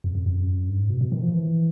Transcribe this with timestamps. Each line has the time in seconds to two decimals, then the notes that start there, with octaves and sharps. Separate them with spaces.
0.04 F2
0.15 F2
0.26 F2
0.36 F#2
0.69 G2
0.79 G#2
0.89 B2
1.01 B2
1.12 D#3
1.22 F3
1.33 E3